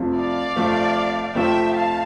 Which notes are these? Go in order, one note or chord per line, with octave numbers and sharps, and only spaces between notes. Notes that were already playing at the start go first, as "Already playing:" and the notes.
Already playing: F2 C3 F3 A3
D5 F5
F2 C3 F3 A3
F2 C3 F3 A3 E5 G5
F5 A5